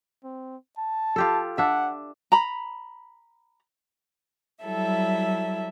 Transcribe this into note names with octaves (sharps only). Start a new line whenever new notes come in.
C4
A5
F4 G4 A4
D4 E5 F#5
A#5 B5
F#3 G3 E4 A4 E5